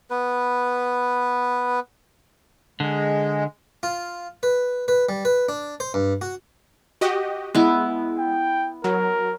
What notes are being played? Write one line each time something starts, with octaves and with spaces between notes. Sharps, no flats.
B3 B4
D3 G#3
F4
B4
B4
G3
B4
D4
C5
G2
F#4
F#4 G4 D#5
G#3 B3 E4
G5
F#3 A#4